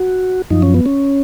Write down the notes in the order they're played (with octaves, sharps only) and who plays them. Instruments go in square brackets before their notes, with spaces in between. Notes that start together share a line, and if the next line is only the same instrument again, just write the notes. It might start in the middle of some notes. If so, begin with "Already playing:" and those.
Already playing: [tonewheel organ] F#4
F#2 F3 D#4
C#4
B3
C#4